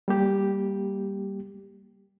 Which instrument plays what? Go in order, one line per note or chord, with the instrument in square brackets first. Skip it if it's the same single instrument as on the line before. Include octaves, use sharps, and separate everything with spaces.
[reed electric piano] G3 A#3 G4